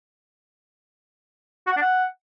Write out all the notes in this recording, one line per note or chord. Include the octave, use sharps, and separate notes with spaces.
F#4
F#5
D4
F#5